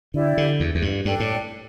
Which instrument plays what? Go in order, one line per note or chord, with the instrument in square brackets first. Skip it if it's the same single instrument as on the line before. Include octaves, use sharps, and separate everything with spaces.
[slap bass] D3 [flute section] E4 G4 D5
[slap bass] D3
E2
E2
G2
[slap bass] G2 [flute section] D4 A4 D5 G5
[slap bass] A2